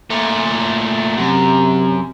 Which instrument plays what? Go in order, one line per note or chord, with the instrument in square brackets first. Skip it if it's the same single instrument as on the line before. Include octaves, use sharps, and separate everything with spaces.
[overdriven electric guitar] A#2 A3
[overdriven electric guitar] F#2 [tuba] C3